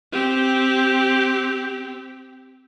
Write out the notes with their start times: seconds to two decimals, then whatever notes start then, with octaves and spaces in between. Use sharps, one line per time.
0.12 C4 G4